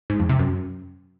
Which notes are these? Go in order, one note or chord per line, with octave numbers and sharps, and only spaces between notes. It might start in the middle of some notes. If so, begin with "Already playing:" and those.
G#2
F2
C3
F#2